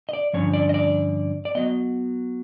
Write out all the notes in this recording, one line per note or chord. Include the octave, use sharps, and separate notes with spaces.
D#5
D5
G2 D3 F3 C#4 C#5
D5
D#5
D5
D5
F#3 B3 D#5